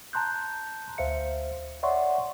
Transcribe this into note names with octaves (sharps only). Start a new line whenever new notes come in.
A5 A#5 C6 F#6 G6
D2 C5 E5 F5 C#7
C#5 D5 E5 F#5 C6 C#6